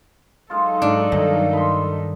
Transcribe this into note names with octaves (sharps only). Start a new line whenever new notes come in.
F#3 G#3 D#4 F4 A4
G#2 D4
G2 A#2 D#3 D#5
B5 C6